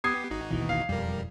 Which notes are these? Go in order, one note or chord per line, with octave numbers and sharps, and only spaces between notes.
B3 G4 D#6 G#6 C7
G#1 D#4 F#4
D#2 B2 E3
F5
E1 F2 G3 A#4